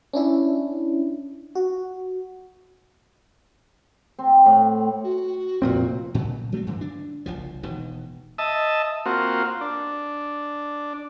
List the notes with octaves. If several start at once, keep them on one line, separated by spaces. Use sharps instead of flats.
C#4 D4 E4
F#4
C4
A2
F#4
F1 A#2 C4
A#2 F#3
F#3 A3 B3 C4
G2 D3 E3
D4
F#1 C2 F3
E1 B2 D#3
D#5 E5 A5
A#3 C4 F4 F#4
D4